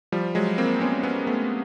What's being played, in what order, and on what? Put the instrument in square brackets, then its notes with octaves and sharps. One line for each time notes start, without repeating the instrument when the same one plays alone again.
[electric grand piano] F3 G3
F#3 G#3
A#3 C4
B3 C#4
B3 C#4
A3 B3